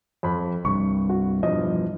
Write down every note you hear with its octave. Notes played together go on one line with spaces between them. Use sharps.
F2 B5
C2 G2 C#6
F#4
E2 G2 B2 F3 D#5